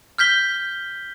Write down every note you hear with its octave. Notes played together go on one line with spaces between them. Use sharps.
F6 G6 B6 G7